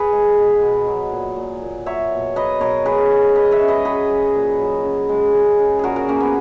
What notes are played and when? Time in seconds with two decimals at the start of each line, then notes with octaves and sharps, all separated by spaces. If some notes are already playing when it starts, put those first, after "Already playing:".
Already playing: G#4 B4
0.13 G#3
0.37 B2
0.62 B2
0.87 F#3
1.12 A#2
1.36 A#2
1.62 A#2
1.86 F#3 C#5 E5
2.11 B2
2.36 F#3 B4 D#5
2.60 B2 A#4 C#5
2.85 G#3 G#4 B4
3.11 G#3
3.35 G#3 B4 D#5
3.51 C#5 E5
3.61 C#3
3.68 B4 D#5
3.85 F#3 G#4 B4
4.10 F#3
4.35 A#2
4.59 F#3
4.84 C#3
5.09 G#3
5.34 C#3
5.59 C#3
5.79 A#2 F#4 G#4 A#4
5.96 F#4 A#4
6.08 F#3 A#3 C#4
6.20 B3